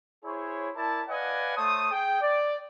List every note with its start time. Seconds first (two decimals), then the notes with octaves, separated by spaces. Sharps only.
0.25 E4 G#4 C5 C#5
0.76 E4 A#4 D5 A5
1.09 B4 D5 D#5 F5 F#5 G#5
1.57 A3 C5 C#5 A5 D#6
1.92 G#4 G5
2.21 D5